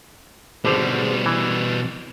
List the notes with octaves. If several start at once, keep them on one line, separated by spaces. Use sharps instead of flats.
G#1 B2 D3 G3 C5
E3